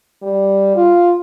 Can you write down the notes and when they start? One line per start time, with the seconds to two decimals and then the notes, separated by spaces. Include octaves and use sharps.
0.22 G3
0.75 F4